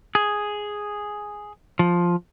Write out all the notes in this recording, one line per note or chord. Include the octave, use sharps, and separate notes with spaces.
G#4
F3